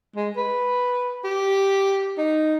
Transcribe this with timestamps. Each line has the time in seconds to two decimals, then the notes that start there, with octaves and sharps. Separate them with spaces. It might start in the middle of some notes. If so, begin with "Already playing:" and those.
0.16 G#3
0.37 B4
1.24 G4
2.18 D#4